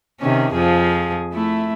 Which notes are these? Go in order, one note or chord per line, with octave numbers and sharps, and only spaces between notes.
C3 D#3 C#4
F2 F3 G#4
A3 E4